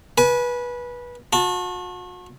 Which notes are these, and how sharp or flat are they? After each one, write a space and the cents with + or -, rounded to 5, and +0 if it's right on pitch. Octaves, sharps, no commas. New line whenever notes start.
B4 -20 G#5 +25
F#4 -40 A5 +0